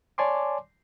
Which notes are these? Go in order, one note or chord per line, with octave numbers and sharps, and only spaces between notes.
C#5 D5 G#5 A5 C6 D6